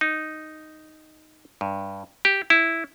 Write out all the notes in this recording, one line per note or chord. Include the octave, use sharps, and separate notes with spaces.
D#4
G2
G4
E4